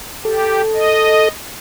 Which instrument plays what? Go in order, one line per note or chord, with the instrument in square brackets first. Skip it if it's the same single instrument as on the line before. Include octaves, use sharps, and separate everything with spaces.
[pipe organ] G4 [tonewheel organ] A4
[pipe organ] D#5